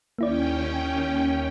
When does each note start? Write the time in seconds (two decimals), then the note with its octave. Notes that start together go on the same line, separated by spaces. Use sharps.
0.19 D#2 A#3 C#4 E4 D5 G5